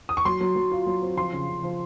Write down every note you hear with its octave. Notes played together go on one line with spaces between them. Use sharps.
D#6
C#6
F#3 C6
F#3
F#3
F4
F#3
C4
F3 C6
C#3
C#3
F3